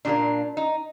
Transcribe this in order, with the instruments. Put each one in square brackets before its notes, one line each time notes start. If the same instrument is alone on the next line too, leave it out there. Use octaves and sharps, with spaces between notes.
[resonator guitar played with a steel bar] A#2 G3 A#3 D4
D#4